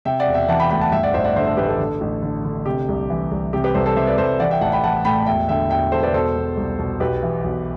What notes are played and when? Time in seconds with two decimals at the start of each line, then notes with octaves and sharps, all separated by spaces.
0.05 C3 E5 G5
0.20 D5 F#5
0.26 E1
0.34 E5 G5
0.48 E3 F#5 A5
0.60 G5 B5
0.70 D2 G5 B5
0.81 F#5 A5
0.92 G2 E5 G5
1.03 D5 F#5
1.14 A1 C5 E5
1.24 D5 F#5
1.36 D3 C5 E5
1.46 A4 C5
1.57 A1 G4 B4
1.69 A4
1.79 D3
2.01 A1
2.23 D3
2.45 D3
2.66 C3 G4
2.88 C2
3.10 E3
3.31 C2
3.53 C3 G4
3.64 G4 B4
3.74 C2 A4 C5
3.86 A4 C5
3.96 C3 C5 E5
4.07 B4 D5
4.18 C2 A4 C5
4.40 E3 D5 F#5
4.51 E5 G5
4.61 A1 F#5 A5
4.72 G5 B5
4.84 E3 F#5 A5
5.05 A2 G5 B5
5.26 E1 E5 G5
5.49 D3 E5 G5
5.70 E1 E5 G5
5.92 E1 A4 C5
6.03 B4 D5
6.14 B2 A4 C5
6.36 B2
6.57 C2
6.79 B2
7.00 B1 G4 B4
7.23 E3
7.44 B1